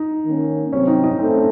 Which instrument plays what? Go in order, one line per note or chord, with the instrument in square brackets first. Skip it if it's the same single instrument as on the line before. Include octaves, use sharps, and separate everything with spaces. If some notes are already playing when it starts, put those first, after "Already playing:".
Already playing: [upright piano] D#4
[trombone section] D#3 A#3 C#4
[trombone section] C3 F#3 C4 [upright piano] C#4
[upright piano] D#4
D#4
[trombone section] A3 C#4 A4 [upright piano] C4